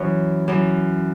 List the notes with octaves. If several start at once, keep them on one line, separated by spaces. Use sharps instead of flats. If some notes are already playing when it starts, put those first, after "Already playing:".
Already playing: F#2 E3 C#5
F#2 E3